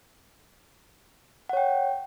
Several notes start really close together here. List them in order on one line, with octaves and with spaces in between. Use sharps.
F#5 C#5 G5